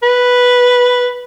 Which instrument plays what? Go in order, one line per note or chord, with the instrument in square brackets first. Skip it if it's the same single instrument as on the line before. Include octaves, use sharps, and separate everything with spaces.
[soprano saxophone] B4